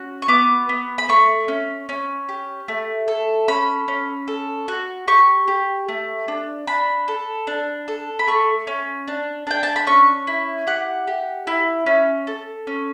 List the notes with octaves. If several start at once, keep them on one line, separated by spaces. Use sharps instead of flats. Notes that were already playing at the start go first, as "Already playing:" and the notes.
Already playing: C#4 F#4
C#6
B3 D6
B3
B5
A3 C#6
C#4
C#4
G4
A3
A4
C#4 B5
C#4
A4
F#4
G4 C#6
G4
A3
D4
D4 B5
A4
D4
A4
B5
A3 C#6
C#4
D4
D4 G5
A5
B5
C#4 C#6
E4
G4 F#5
G4
E4
C#4
A4
C#4